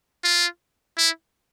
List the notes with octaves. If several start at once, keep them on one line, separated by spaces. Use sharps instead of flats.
F4
E4